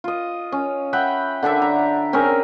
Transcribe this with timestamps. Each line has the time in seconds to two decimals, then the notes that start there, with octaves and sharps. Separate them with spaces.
0.04 F4 D#5
0.52 C#4
0.93 E5 F#5 G5 B5
1.43 D3 D4 A4 E5
1.62 A#5
2.13 C4 C#4 G#4 A#4